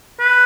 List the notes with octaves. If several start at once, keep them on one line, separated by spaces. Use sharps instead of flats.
B4